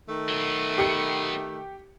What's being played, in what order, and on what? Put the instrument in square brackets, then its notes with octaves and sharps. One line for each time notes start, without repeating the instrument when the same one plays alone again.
[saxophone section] D#3 A3
[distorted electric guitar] F#3 B3
[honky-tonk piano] G4 C#7